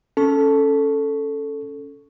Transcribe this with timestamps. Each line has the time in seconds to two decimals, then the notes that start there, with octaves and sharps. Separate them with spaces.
0.17 C#4 A4 C#6